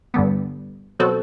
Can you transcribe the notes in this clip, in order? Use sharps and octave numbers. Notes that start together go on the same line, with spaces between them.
G2 D3 G3 B3
B2 F#3 C4 F#4 A4